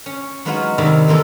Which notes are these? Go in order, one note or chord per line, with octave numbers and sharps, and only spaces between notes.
C#4
F#3 G#3 B3 D#4 F4 F#4
C3 D#3 G3 D#4 E4
C3 E3 A#3 F4 A4